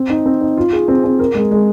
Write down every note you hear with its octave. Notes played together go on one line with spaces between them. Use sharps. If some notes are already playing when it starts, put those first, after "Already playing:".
Already playing: C4
D#4
C4
D#4
F4
G#4
C4
C4
A#4
G#3
G#3